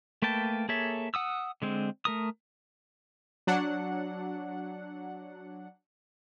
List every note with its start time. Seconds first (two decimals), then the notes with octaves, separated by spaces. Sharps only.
0.22 A3 A#3 B4 G5 A5
0.69 A#3 G#4 A4 C#5 E5
1.14 F#5 D#6 E6
1.62 D3 G#3 C4
2.05 A3 A#4 D#6
3.47 F#3 D4 F#5